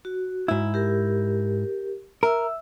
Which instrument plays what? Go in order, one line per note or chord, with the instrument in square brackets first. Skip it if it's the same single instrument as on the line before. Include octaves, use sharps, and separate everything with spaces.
[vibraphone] F#4
[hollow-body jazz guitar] G#2 E4
[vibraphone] G4 A#4
[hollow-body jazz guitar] A#4 [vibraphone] E5 E6